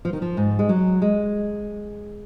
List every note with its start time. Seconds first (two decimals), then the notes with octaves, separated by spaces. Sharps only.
0.05 F3
0.13 D#3
0.22 F3
0.37 G#2
0.59 G#3
0.69 F#3
1.02 G#3